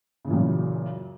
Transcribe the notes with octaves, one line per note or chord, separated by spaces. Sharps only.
F#2 A#2 C#3 E3